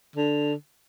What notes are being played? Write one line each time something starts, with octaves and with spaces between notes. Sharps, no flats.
D3